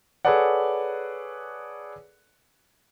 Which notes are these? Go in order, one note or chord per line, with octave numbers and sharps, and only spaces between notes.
G#4 A4 B4 C#5 D5 F#5